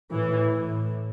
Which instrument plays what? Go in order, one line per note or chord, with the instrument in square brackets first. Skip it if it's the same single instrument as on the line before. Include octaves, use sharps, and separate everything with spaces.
[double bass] A2 [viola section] E3
[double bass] A2